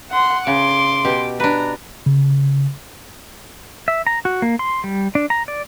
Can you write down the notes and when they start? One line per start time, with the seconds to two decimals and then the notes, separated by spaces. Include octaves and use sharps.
0.11 F#5 C6
0.47 C#3 C6 D6
1.05 B2 G4
1.40 D4 B4 A#5
2.06 C#3
3.88 E5
4.07 A#5
4.25 F#4
4.42 A#3
4.59 C6
4.84 G3
5.15 D4
5.30 A#5
5.48 D5